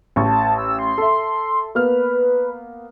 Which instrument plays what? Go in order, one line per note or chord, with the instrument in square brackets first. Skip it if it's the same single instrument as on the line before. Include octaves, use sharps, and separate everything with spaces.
[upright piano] A1 C#6 [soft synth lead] A5
[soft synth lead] E6
C6
[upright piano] A4 E5
[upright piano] A#3 B3 F6 [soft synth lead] B4